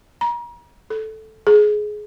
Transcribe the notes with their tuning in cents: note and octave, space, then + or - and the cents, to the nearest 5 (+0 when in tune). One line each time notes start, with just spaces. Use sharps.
A#5 +35
A4 -5
G#4 +20